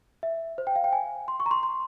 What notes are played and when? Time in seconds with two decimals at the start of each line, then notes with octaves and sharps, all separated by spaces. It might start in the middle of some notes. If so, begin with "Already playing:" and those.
0.23 E5
0.58 C5
0.67 G5
0.76 F5
0.84 G5
0.93 G#5
1.28 C6
1.40 C#6
1.46 A#5
1.51 C6
1.63 C6